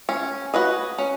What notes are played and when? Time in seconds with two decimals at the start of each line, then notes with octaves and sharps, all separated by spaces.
0.09 C#4
0.54 F#4 B4 D#5
0.98 C#4